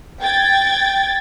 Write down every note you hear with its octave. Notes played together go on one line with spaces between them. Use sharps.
G5 G#6 A6